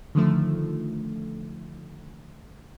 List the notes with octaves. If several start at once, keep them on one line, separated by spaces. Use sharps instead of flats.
D3 D#3 F3 A3